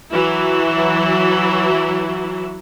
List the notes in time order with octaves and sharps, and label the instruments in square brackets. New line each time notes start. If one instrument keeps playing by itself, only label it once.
[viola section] E3 F#3 E4 F#4